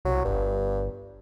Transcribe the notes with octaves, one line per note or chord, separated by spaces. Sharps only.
C2 F#3
G1 G2